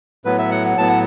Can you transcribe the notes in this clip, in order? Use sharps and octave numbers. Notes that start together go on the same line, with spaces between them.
A2 F#3 B3 B4
E5
F#5
A2 F#3 B3 A5
F#5